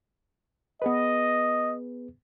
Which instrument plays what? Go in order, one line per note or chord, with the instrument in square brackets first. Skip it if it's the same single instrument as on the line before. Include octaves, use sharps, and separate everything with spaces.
[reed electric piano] B3 G#4 B4 [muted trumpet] D#5